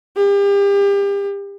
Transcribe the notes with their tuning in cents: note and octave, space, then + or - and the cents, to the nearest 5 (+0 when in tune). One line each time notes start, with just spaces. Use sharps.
G4 +35